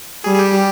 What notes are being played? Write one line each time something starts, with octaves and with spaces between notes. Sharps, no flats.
G3 G#4
G#4
G4